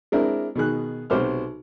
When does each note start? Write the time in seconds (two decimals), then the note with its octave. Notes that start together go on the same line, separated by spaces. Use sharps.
0.12 G#3 C4 D4 E4 A#4
0.56 B2 D#3 G#4 F#6
1.10 B1 C3 F#4 C5 D6 F6